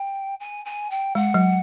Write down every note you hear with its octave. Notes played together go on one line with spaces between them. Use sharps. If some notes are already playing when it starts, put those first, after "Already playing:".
Already playing: G5
G#5
G#5
G5
G#3 F#5
F#3